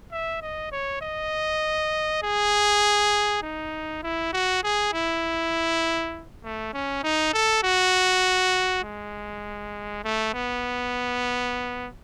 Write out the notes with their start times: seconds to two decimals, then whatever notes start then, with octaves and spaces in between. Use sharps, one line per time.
0.12 E5
0.42 D#5
0.72 C#5
1.02 D#5
2.23 G#4
3.42 D#4
4.03 E4
4.33 F#4
4.64 G#4
4.93 E4
6.44 A3
6.74 C#4
7.03 D#4
7.33 A4
7.63 F#4
8.84 G#3
10.04 A3
10.34 B3